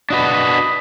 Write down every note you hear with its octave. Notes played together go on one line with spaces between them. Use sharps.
D4 F#4 B4 D#5 B5